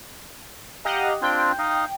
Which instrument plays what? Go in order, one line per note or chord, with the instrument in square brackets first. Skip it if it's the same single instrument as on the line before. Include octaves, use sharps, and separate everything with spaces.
[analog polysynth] G4 D#5 F#5 [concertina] F5 A#5
[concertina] C4 D4 F4 [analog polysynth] G5
[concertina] D#4 D#5 F5